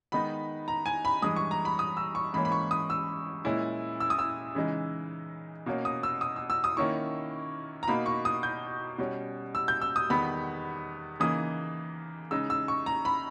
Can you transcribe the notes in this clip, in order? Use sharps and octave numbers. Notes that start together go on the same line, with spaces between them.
D#3 G#3 B3 D#4 B5
A#5
G#5
B5
G2 E3 G#3 D#6
C#6
A#5
B5
D#6
E6
C#6
G#2 E3 A#3 C#4 B5
B5
C#6
D#6
E6
A#2 G#3 C#4 E4
E6
D#6
E6
C#3 E3 G#3 D#4
B2 A#3 C#4
D#6
E6
D#6
E6
E6
D#6
D#3 A#3 C#4 E4 C#6
A#5
B2 A#3 D#4 B5
C#6
D#6
G6
B2 G3 C#4
E6
G6
E6
D#6
E2 D#3 G3 B3 B5
C#3 E3 A#3 D#4 D#6
C#3 G#3 D#4 E6
E6
C#6
A#5
B5